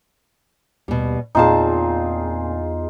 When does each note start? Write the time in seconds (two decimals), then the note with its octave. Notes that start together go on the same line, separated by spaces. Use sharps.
0.88 D#2 B2 G3
1.35 E2 A#2 C4 D#4 F4 G#4 A5